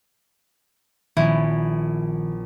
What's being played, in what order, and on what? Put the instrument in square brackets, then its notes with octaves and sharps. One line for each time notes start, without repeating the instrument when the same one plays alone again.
[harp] A#1 B3 C#4 [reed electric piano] D#3 [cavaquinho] E4